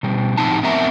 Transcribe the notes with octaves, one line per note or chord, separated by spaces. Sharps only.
B2 G3
A2 F3 C4 D#4 A5
B3 C4 A#4 E5 A#5